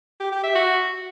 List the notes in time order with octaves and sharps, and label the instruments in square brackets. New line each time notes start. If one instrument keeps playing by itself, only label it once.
[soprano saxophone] G4
G4
E5
F#4